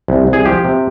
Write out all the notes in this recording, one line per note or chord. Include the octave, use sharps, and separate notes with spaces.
C2
C2
G#4
F3 G4
C3